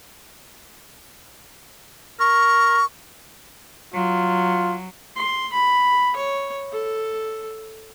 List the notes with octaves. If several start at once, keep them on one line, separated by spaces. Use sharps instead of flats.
A#4 C#6
F#3 F4
C6
B5
C#5
A4